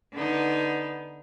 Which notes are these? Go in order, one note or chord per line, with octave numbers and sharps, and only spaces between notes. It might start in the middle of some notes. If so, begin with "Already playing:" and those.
D3 B3 D#4